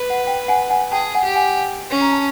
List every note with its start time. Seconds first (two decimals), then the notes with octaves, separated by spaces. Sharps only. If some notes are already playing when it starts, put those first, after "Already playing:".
Already playing: B4
0.10 F#5
0.27 G5
0.48 F#5 G#5
0.70 F#5 G#5
0.92 G#4 G5 A5
1.15 F#5 G#5
1.25 G4
1.36 F#5 G#5
1.91 C#4
2.01 A#5
2.13 A5